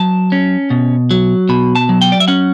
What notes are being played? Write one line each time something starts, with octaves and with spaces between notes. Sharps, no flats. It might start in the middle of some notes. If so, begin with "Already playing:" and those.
Already playing: F#3 A5
C#4
B2
F#3
B2 B5
A5
F#3
G5
D5
E5
C#4 F#5